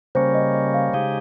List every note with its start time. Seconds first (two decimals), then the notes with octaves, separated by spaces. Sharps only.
0.15 C#3 G3 A#3 C#4 C5
0.34 D#5
0.55 D#5
0.74 F5
0.93 C#3 G#3 D#4 G4 F5